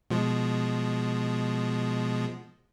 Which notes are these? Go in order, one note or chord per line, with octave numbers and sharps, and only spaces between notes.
B2 F3 G#3